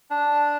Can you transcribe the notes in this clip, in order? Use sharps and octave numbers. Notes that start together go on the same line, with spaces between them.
D4